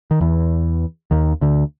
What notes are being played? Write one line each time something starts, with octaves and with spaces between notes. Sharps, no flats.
D#3
E2 E3
D#2 D#3
D2 D3